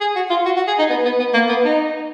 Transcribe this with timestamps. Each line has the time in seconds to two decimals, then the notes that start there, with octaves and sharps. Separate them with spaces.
0.01 G#4
0.16 F#4
0.30 F4
0.45 F#4
0.56 F#4
0.68 G#4
0.79 D#4
0.90 B3
1.05 B3
1.19 B3
1.34 A#3
1.49 B3
1.65 D#4